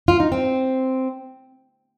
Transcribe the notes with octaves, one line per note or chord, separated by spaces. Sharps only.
F4
D#4
C4